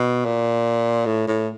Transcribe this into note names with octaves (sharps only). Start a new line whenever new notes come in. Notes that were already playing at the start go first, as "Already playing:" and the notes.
Already playing: B2
A#2
A2
A2